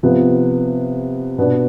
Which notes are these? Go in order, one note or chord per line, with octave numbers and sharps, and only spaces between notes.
C3 F3 B3
B2 B3 D4